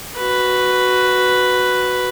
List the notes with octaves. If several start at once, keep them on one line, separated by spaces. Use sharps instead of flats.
F#4 B4